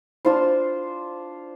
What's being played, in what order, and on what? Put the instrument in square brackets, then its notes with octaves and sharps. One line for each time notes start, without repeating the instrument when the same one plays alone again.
[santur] D4 F4 C5